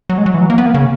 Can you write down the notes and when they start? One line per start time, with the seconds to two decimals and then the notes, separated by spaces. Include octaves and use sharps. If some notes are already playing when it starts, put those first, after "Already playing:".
0.09 F#3
0.18 G#3
0.26 F#3
0.34 E3
0.41 F#3
0.50 A#3
0.58 B3
0.66 A#3
0.74 C#3